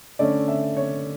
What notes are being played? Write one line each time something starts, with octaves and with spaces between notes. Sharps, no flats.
D3 A3 C#4 D5
E5
C#5